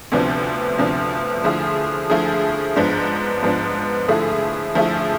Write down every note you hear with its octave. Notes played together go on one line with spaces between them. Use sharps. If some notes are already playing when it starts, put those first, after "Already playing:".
D2 C3 F3 B3 D4
D2 C3 F3 B3 D4
D3 F3 A3 E4 G#4
D3 F3 A3 E4 G#4
G#2 F3 B3 D4
G#2 F3 B3 D4
D3 F3 A3 E4 G#4
D3 F3 A3 E4 G#4